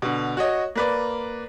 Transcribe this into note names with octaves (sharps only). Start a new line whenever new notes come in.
B2 D3
F#4 C#5 D#5
A#3 B4 D5